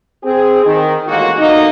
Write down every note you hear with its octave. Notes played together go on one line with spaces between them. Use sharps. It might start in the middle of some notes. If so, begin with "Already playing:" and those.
C4 G#4
D#3
A1 G#3 A#3 F#4
B2 D3 A#3 D#4